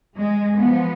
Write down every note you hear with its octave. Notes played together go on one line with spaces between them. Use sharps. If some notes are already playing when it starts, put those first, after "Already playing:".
G#3
F3 B3